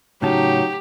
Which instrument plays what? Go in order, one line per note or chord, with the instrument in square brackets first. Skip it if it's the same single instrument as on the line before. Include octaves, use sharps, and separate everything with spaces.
[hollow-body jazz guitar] A2 C#3 A5 [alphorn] F#3 [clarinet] D#4 [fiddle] G4